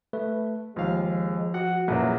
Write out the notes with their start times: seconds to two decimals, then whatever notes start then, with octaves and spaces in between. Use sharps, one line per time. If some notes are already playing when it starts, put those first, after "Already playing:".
0.13 A3 B4
0.76 D#2 F3 G#3 F5
1.54 F#4 F#5
1.88 A#1 F#2 A#2 E3 F#3 A#3